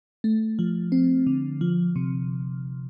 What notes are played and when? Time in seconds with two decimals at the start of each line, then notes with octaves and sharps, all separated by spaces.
0.24 A3
0.59 F3
0.92 C4
1.27 D3
1.61 F3
1.96 C3